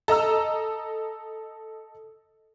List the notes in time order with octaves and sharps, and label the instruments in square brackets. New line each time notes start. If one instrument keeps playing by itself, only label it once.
[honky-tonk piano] A4 D#5 A#5 E6